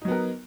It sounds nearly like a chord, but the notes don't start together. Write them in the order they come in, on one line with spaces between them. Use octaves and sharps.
D#4 F#3 B3 A#4